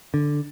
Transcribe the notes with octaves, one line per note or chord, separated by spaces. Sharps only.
D3